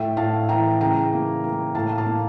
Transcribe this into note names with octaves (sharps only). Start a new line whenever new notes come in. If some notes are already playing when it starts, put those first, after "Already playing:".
Already playing: A2 E5 G5
A2 F5 A5
E3 G5 A#5
C#3 G5 A#5
A#3
A#3
A2 F5 A5
F5 A5
A#3